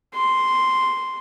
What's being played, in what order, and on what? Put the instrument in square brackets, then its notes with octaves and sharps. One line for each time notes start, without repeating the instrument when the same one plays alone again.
[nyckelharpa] C6